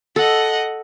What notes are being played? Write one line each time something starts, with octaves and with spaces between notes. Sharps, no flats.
A4 D#5 F#5